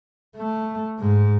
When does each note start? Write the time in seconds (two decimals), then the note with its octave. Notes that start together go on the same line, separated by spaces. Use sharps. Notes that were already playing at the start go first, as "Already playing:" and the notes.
0.36 A3
0.99 G#2